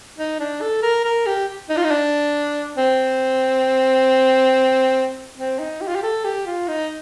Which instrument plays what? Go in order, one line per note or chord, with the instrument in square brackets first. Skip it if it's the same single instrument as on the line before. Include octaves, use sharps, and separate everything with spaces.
[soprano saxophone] D#4
D4
A4
A#4
A#4
G4
D#4
F4
D#4
D4
C4
C4
D#4
G4
F4
G4
A4
G4
F4
D#4